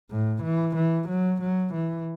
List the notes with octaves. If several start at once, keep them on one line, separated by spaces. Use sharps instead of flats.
A2
E3
E3
F#3
F#3
E3